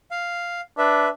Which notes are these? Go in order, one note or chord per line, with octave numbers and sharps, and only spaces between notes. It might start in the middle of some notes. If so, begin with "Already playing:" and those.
F5
D4 B4 E5